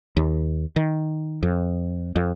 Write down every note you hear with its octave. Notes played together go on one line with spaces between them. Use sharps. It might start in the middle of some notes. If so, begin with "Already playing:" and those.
D#2
D#3
F2
F2